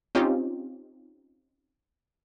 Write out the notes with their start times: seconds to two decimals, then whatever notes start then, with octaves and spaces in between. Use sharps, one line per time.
0.15 C4 C#4 D#4 F4 G4